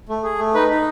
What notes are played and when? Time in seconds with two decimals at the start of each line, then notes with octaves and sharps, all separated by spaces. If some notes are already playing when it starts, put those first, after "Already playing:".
0.09 A3
0.24 G#4
0.39 A3
0.54 D#4 B4
0.70 D#4